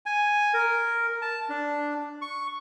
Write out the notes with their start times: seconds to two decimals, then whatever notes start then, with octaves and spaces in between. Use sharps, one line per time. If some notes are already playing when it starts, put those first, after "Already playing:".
0.06 G#5
0.54 A#4
1.22 A5
1.49 D4
2.22 C#6